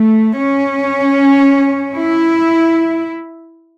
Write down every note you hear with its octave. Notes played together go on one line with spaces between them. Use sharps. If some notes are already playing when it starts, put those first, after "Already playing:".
Already playing: A3
C#4
E4